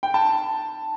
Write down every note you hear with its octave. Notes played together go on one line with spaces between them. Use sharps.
G5
A5